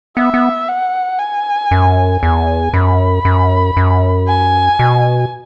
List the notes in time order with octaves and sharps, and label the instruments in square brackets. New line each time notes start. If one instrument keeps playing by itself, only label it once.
[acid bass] B3 [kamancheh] E5
[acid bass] B3
[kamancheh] F#5
G#5
[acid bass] F#2
[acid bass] E2 [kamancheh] G#5
[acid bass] F#2 [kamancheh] B5
[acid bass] F#2
F#2
[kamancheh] G#5
[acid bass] B2